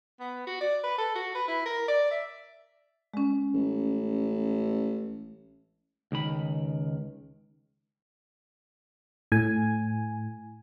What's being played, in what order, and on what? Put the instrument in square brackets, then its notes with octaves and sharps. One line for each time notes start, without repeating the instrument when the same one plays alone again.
[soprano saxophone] B3
F#4
D5
B4
A4
F#4
B4
E4
A#4
D5
E5
[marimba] G#3 C#4
[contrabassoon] A1
[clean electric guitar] C#2 D#3 B5
[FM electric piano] A2 G#5